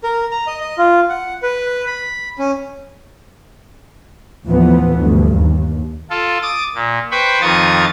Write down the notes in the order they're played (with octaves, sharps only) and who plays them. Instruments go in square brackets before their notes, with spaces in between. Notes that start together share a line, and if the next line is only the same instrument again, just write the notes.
[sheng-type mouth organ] A#4
A#5
D#5
D#5
F4
F#5
B4
B5
C#4
[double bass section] D#2 A2 E3 F3 B3
D2 G2
D#2
[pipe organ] F4 A4
D6 D#6 A6
A#2
B4 C5 G5 B5 C#6
F2 D#3 F4 C#6 D#6 A6